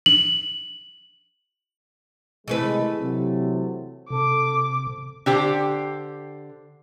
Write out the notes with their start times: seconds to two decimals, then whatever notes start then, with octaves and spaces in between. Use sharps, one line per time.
0.06 F#7
2.48 C3 D#3 E3 G#3 A3 B4
3.00 C3 F#3
4.10 C3 A4 D6
5.26 D3 G4 C5